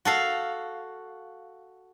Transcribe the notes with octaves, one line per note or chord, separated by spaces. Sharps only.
F#4 A4 F5